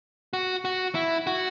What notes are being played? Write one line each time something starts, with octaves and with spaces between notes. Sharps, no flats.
F#4
F#4
E4
F#4